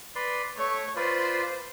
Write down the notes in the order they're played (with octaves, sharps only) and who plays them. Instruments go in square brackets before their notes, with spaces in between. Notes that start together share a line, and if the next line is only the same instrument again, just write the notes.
[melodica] B4 D5 C6
[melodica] A3 [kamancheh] C#5
[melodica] F4 B4 D5 [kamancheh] C5